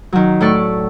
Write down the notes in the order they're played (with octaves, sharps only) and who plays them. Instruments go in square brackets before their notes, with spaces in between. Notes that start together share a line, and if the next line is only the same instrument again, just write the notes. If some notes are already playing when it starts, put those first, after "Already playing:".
[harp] D#3 F#3
A2 A4 D5 C#6